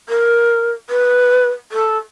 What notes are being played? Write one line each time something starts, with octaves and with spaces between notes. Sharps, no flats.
A#4
B4
A4